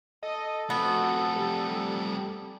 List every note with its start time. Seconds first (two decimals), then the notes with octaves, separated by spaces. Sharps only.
0.23 A4 D#5
0.70 A3 B3 C4 F#4
1.36 G3